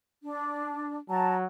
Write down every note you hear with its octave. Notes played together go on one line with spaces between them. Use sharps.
D4
F#3 A5 A#5